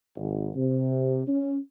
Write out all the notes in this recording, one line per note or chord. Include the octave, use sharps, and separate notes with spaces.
G#1
C3
C#4